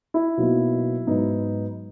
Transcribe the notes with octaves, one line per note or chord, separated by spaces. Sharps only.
E4
B2 F#3 A#3 D#4
G#2 F#3 B3 D#4